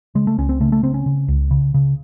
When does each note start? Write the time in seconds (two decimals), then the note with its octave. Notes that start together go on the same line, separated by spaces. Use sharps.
0.15 C#3 G#3
0.27 A3
0.38 C#2 C#4
0.49 C4
0.60 C#3 A3
0.72 A3
0.83 C#3 C4
0.94 C#4
1.06 C#3
1.28 C#2
1.51 C#3
1.74 C#3